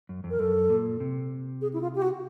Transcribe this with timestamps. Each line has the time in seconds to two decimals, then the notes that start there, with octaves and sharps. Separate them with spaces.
0.09 F#2
0.24 F2
0.30 A#4
0.39 F#2 A4
0.70 A#2
1.00 C3
1.61 G#4
1.73 E4
1.82 F4
1.95 G4
2.02 F#4